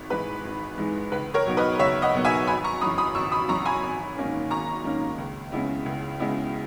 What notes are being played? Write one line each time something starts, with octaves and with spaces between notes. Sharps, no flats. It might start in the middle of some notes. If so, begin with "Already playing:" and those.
Already playing: G#1
G#2 E3 G#3 B4
G#1
G#2 E3 G#3
C#2 B4
A#4 C#5
B2 F#3 B3 D#4
B4 D#5
C#2 C#5 E5
D#5 F#5
B2 F#3 B3 D#4
E5 G#5
G#1 G#5 B5
A#5 C#6
F#2 E3 B5 D#6
B5 D#6
G#1 C#6 E6
B5 D#6
F#2 E3 A#5 C#6
G#5 B5
G#1
G#2 D#3 A#3 C#4
G#1 A#5 C#6
G#2 D#3 A#3 C#4
C#2
C#3 G#3 B3 E4
C#2
C#3 G#3 B3 E4